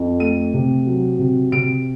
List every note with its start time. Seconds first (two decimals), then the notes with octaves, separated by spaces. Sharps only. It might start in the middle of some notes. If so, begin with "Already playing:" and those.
Already playing: F2
0.20 A3 D#7
0.54 C3
0.86 F#3
1.19 C3
1.52 C3 D7